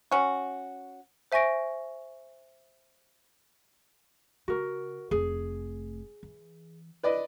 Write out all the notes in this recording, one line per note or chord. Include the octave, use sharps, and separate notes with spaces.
C#4 F#4
C5 E5 G#5 C#6 A#6 D7
C#3 F#4 A#4
F1 A3 G#4
E3
B4 D5 D#5